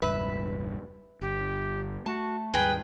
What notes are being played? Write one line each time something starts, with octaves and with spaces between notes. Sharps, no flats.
E1 C#2 G2 B4 E5
G1 G2 G4
A3 F#4 A5
D#2 G#2 G3 G#4 B4 G5